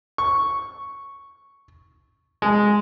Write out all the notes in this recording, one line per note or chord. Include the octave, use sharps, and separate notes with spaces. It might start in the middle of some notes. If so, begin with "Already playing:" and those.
C#6
G#3